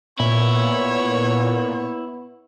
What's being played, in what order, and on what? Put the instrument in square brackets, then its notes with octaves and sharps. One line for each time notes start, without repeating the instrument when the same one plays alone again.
[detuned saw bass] A#2 [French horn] B3 [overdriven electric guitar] E4 [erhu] C#5